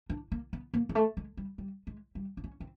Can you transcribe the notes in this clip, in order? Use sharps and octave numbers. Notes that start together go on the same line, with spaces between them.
D4
A#3
B3
A#3
G#3
A3
G#3
G3
G3
G#3
G3
D4
C#4
C4